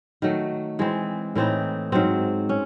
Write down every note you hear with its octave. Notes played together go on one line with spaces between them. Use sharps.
D#3 F#3 A3
E3 G#3 C4
A2 E3 C4 D#4
G#2 F#3 C4
C#4